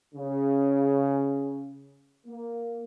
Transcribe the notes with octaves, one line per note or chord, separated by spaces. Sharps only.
C#3
A#3